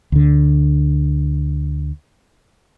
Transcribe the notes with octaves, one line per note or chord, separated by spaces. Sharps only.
D2 D3